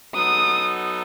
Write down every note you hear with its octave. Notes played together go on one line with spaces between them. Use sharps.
F#3 B3 D#4 A4 D#6